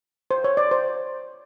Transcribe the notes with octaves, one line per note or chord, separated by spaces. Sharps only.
C5
C#5
D5
C5